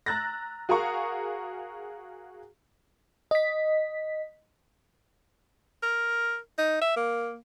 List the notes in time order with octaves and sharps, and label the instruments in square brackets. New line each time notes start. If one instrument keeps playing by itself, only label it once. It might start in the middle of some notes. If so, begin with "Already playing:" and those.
[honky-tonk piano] A#5 E6 F#6 A6 A#6
F#4 G#4 A#4 F5 A#5 C#6
[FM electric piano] D#5 B6
[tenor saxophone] A#4
D#4
E5
A#3